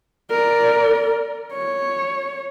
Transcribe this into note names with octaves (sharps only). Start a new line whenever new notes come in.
A#4 D5
C#5